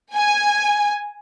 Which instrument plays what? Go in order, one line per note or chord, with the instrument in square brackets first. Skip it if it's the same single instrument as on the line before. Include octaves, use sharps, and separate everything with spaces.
[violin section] G#5